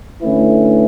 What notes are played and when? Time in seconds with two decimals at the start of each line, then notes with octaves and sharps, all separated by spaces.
0.21 D3 A3 C#4 E4 B4